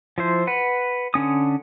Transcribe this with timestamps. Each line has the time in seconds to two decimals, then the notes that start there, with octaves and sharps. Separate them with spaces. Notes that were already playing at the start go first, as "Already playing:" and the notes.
0.18 F3 E4 C5
0.47 B4 F#5
1.14 D3 C#4 D#6